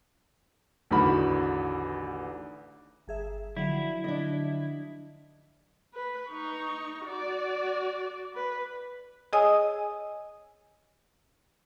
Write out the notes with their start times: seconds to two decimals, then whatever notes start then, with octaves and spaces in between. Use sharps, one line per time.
0.91 A1 E2 D3 D#3 F#4 B5
3.08 G1 G#4 E5
3.57 D3 F3 F#3 E4
4.04 D4 D#5
5.94 B4
6.30 D#4 C#6
7.05 F#4 D5
8.36 B4
9.33 G#4 C#5 D#5 G#5 D#6 E6